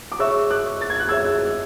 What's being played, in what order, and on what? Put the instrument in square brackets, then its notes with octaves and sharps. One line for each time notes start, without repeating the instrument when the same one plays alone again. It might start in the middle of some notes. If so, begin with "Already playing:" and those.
[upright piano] D6
[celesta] G#4 C#5 E5 [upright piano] C#6 E6
[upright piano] D6 F#6
A6
G#6
F#6
[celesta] G#4 C#5 E5 [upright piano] E6 G#6